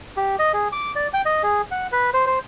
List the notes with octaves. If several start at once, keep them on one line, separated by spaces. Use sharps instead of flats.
G4
D#5
G#4
D6
D5
G5
D#5
G#4
F#5
B4
C5
C5